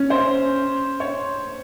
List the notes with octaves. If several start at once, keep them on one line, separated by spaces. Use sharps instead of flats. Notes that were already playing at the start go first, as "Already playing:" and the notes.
Already playing: C#4
C5
C#5